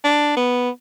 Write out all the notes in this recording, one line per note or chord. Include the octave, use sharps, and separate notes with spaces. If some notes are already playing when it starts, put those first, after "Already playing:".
D4
B3